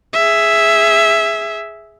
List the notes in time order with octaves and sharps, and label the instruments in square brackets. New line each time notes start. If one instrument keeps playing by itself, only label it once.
[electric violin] G#4 E5